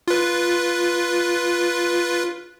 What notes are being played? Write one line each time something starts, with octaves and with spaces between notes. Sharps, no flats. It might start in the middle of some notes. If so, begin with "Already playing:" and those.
F4 B4